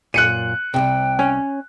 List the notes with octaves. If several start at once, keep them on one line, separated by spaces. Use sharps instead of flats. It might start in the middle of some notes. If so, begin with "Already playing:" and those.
F#2 A#2 F#6 C#7 D#7
C2 G#2 C3 G5
C#4